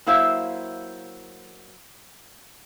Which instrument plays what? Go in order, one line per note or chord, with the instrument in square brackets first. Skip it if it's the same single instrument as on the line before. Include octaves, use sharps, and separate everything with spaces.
[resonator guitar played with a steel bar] F#3 A#3 E4 C5 E5 F5